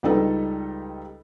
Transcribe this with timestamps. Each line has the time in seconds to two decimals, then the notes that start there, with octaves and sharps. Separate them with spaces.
0.03 C#2 G3 D#4 A4 B4